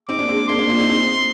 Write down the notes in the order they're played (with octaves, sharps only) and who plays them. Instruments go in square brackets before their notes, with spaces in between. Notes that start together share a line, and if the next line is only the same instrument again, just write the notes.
[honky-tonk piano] C4 D#4 [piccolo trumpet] D6
[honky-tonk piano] A#3 D4
G#3 C4
[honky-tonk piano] A#3 D4 [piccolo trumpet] C6
[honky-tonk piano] A#3 D4
D4 F4
C4 D#4
C4 D#4